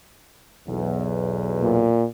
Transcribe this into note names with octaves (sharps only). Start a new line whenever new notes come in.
B1 E2
A#2